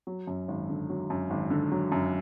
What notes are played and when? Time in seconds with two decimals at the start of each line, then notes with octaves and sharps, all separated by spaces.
0.07 F#3
0.27 F#2
0.48 G#1
0.69 D3
0.90 F#3
1.10 F#2
1.30 G#1
1.50 D3
1.72 F#3
1.92 F#2